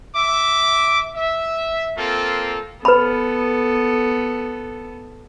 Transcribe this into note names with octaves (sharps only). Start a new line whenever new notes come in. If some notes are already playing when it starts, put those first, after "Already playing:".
E5 D6
E5
A#3 C4 F4 A4
B3 A4 B4 B5